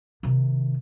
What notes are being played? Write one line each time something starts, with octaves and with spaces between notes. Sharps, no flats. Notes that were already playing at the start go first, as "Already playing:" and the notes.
C3 D#3